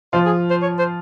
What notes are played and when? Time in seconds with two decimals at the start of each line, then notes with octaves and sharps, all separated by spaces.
0.13 F3 F4 C5
0.26 G#4
0.50 C5
0.62 C#5
0.79 C5